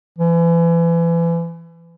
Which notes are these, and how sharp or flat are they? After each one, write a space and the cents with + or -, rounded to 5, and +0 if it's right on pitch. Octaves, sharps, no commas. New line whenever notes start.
E3 +35